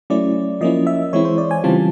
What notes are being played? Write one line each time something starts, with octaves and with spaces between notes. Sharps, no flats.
F#3 A3 C#4 E4 D5
F3 A#3 C#4 E4 D#5
E5
E3 G#3 C4 E4 C#5
C5
D5
G#5
C#3 E3 G3 C4 F4 A5